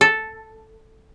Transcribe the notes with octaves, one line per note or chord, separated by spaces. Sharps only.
A4